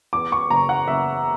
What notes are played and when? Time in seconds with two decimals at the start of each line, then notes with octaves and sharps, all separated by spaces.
0.13 E2 D6
0.32 C#6
0.50 F#1 A#5
0.69 F#5
0.88 F#1 E5